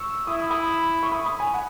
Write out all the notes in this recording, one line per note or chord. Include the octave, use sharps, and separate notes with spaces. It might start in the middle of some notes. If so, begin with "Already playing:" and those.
Already playing: C#6 E6
E4 D#6
E6
B5 D#6
C#6
B5 D#6
B5 D#6
G#5 B5
F#5